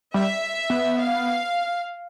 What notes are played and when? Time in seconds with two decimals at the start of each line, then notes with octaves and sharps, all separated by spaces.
0.14 G3 E5
0.70 B3
0.99 F5